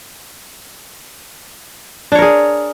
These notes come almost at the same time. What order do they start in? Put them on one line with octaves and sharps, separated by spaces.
D4 C#5 A#4 G#4